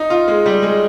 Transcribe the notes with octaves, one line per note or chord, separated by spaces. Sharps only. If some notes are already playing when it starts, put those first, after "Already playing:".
Already playing: D#4
F4
G#3
G3
G#3